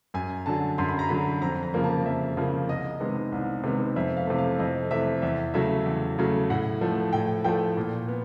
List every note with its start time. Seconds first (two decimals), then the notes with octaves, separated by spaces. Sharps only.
0.14 F#2 G#5
0.46 D3 F#3 A5
0.78 F#2 C6
0.88 B5
0.99 A#5
1.09 D3 F#3 B5
1.41 F2 A#5
1.63 A#5
1.74 C#3 F3 A#3
1.84 A5
2.05 F2 E5
2.37 C#3 F3 A#3
2.68 C2 D#5
3.00 C3 D#3 G#3 B3
3.32 C2
3.64 C3 D#3 G#3 B3
3.96 F2 E5
4.17 F5
4.27 C3 E3 A3
4.38 F5
4.59 F2 D#5
4.91 C3 E3 A3 E5
5.22 E2 E5
5.54 C#3 F#3 A3 E5
5.86 E2
6.19 C#3 F#3 A3
6.50 A2 F#5
6.81 F3 A3
7.13 A2 G5
7.44 F3 A3 G5
7.77 A#2
8.08 B3